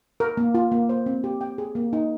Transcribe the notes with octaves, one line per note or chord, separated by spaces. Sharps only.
A#4
A#3
F4
A#3
C5
C4
G4
G5
G#4
A#3
D#4